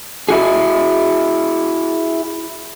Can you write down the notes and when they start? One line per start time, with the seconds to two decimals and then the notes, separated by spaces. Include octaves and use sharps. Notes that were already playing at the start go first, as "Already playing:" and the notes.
0.29 E4 F#4 G#4